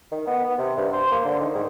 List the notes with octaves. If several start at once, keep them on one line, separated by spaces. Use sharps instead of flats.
D#3
B3
B3
C3
G2
C5
A#3
D3
D#3
G#2